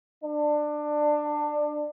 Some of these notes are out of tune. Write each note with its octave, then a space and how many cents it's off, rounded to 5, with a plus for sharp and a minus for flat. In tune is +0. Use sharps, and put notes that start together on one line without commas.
D4 +20